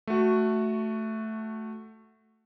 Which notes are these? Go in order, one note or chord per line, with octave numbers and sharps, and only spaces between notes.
A3 F#4